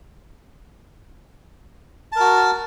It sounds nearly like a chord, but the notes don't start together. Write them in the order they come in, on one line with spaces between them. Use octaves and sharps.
A5 A#4 F#4